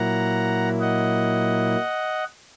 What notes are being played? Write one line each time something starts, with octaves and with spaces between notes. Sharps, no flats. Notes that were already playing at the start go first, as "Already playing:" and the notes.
Already playing: A#2 F#3 A#3 E4 F#5 A#5
D#5 F#5